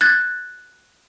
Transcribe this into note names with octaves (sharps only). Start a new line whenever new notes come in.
F#6 G#6 A6